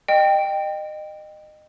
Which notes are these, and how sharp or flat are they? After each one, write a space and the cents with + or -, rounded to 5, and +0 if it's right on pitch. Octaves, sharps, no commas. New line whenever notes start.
D#5 -25 G5 +0